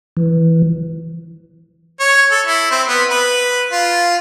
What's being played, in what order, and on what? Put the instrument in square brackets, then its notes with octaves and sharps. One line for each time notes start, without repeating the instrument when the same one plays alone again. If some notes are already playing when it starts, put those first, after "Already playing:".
[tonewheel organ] E3
[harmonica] C#5
A4
E4
C4
B3
B4
F4